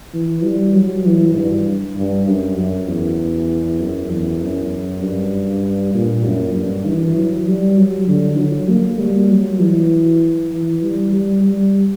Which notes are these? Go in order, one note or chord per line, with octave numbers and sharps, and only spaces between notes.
E3
G3
F#3
E3
G2
G2
F#2
F#2
E2
F#2
E2
F#2
G2
A#2
F#2
G2
E3
F#3
G3
F#3
D3
F#3
A#3
G3
F#3
E3
E3
G3
G3
G3